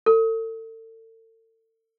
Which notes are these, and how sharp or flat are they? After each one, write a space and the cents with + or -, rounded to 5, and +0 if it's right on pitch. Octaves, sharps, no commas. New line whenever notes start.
A4 +40